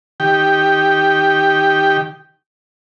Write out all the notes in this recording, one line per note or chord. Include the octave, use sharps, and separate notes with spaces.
D#3 G4 G5